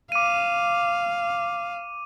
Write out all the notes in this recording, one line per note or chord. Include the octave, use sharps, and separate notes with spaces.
F5 D6 D#7